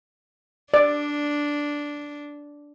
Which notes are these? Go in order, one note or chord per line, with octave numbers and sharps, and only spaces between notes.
D4 D5